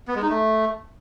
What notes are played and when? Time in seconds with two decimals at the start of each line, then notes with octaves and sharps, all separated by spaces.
0.08 B3
0.15 G#3
0.22 D#4
0.29 A3